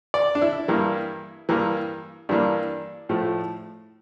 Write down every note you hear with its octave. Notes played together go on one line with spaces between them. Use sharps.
D5
D4
E4
G2 E3 A#3
G2 E3 A#3
G2 E3 A#3 D4
A2 F3 A3